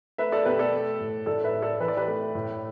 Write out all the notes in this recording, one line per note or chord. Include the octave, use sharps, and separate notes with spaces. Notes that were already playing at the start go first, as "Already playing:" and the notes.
A3 B4 E5
A4 D5
B2 G4 B4
A4 D5
A3
A2
A2 A4 D5
B4 E5
A3
A4 D5
E3 B4
D5
G4 B4
A3
A2